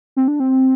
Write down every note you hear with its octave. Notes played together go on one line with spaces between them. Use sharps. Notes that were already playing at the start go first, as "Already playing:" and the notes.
C4
D4
C4